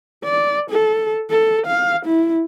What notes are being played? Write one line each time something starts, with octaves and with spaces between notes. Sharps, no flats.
D5
A4
A4
F5
E4